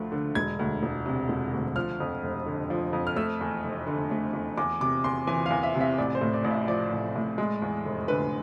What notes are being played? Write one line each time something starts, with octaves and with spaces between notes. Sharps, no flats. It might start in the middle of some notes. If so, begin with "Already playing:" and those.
Already playing: D2 D3 F3 A3
D3
E1 G#6
D2
E1
C3
E1
D2
F3 F6
F2
F1
D3
F3
F2
F6
A3 E6
E2
F1
D3
A3
E2
E2 D6
C3 D6
E2 C6
E3 G#5
E2 F5
E5
C3
E5
A1 D5
C5
A2
D5
A1
E5
F3 D5
A1
A2
G#3
E2
F1
D3 B4